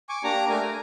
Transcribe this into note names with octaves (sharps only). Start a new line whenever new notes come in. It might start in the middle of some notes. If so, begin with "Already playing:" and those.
G#5 C#6 D6
A#3 D4 G4 A#5 D6
A3 A#4 G#5
G#5